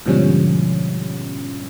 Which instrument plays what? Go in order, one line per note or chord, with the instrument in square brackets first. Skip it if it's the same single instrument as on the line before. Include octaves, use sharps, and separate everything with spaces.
[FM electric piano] G#2 B2 D3 F3 G3 C#4